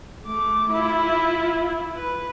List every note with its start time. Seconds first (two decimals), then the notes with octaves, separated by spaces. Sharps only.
0.24 A3 D6
0.70 E4 F4
1.96 B4